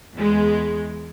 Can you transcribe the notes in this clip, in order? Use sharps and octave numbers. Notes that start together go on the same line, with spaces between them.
E2 G#3